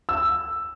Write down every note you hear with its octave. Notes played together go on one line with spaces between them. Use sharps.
E6